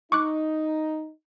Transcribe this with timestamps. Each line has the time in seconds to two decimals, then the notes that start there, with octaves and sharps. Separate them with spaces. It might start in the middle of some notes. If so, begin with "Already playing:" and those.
0.12 D#4 C#6 D6 F#6